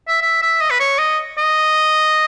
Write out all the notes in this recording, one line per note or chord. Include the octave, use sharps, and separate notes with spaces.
E5
E5
E5
D#5
B4
C#5
D#5
D#5